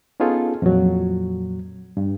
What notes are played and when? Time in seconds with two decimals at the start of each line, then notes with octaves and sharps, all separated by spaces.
0.20 B3 C#4 D#4 F4 G#4 A4
0.62 F2 A#2 F#3
1.97 G2